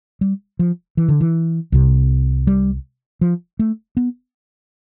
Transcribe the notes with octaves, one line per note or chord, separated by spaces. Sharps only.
G3
F3
E3
D3
E3
C2 C3
G3
F3
A3
B3